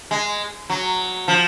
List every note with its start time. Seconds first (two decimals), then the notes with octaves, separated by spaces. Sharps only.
0.11 G#3
0.70 F#3
1.28 F3